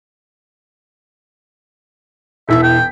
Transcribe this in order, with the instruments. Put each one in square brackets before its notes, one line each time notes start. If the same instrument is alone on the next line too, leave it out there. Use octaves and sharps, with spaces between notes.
[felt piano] E1 E3 B6 [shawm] E5
[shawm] G5